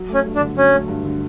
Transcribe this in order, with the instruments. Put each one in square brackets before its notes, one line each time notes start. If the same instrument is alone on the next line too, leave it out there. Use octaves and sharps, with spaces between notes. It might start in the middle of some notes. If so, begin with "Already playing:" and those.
Already playing: [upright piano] F#3
[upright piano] A3 [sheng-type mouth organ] C#4
[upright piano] G2
[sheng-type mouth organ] D4
[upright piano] D3
[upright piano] F#3 [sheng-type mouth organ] C#4
[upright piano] A3
G2
D3